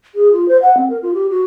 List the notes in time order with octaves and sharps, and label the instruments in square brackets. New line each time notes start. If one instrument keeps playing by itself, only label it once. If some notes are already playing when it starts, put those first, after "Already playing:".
[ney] G#4
F4
C5
F#5
C4
A#4
F4
G4
F#4